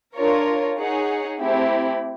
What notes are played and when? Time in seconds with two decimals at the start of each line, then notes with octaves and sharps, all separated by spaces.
0.15 D4 F4 A#4 C#5
0.77 D#4 G#4 C#5 F#5
1.39 A3 C4 E4 G4